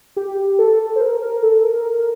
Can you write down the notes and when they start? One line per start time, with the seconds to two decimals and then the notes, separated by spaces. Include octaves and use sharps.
0.16 G4
0.59 A4
0.96 C5
1.01 A#4
1.22 A#4
1.43 A4
1.65 A#4